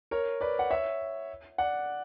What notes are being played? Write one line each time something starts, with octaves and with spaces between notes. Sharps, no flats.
A#4 C#5
B4 D5
F#5
C#5 E5
D5 F#5